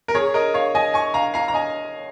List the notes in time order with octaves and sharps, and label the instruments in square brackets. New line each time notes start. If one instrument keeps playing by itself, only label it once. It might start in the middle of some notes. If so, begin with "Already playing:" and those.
[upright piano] A#4
G#4 C#5
A#4 D#5
C#5 F5
D#5 G#5
G#5 C#6
F5 A#5
F5 A#5
A#5
D#5 G#5